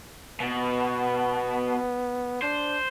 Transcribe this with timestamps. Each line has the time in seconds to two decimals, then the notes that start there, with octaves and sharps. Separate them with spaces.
0.40 B2 B3
2.42 D4 C5